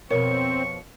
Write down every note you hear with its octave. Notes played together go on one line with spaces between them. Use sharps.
F2 B2 C4 A#4 C#5 C#6